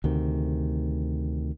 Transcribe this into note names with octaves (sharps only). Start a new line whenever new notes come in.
D2 C3 D#3